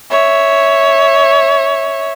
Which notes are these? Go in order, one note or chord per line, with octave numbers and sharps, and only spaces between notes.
C#5 E5